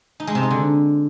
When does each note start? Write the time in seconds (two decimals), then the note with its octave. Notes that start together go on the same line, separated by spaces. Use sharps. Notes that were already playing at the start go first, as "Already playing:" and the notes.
0.20 D#4
0.27 G#3
0.35 C3
0.43 D#4
0.50 D3